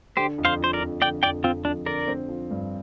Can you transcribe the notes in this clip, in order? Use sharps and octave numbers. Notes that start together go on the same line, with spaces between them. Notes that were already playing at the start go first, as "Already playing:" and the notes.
D3 G4 C5
F2
C5 F5
F3 C5
A#4 D5
F2
D3 D5 G5
F2 D5 G5
F3 C4 F4
F2 D4
D3 A#4 D5
C4
F3
G2